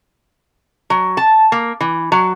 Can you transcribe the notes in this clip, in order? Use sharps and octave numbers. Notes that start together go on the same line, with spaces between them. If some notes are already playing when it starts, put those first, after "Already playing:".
F#3
A5
A#3
E3
F#3